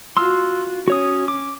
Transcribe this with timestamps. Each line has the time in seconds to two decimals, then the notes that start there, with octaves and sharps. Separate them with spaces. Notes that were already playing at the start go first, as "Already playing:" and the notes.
0.17 F4 F#4 C6 E6 F6
0.88 C#4 F#4 C#5 D#6
1.28 D6